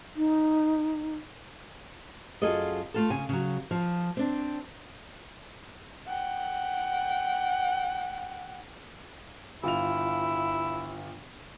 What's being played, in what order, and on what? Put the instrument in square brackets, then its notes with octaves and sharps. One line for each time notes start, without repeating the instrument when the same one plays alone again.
[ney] D#4
[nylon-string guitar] F#2 F4 G#4 A4 D#5
A3 F4 A4
C#3 G#5
C#3 F#3
F3
C4 D4
[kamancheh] F#5 G5
[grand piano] G1 F4 F7 [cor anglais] E4